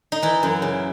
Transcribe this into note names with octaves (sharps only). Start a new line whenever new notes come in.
D#4
E3 E4
F#2
C#3